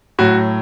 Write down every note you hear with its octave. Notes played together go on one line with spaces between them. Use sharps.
A2 F#3 F#4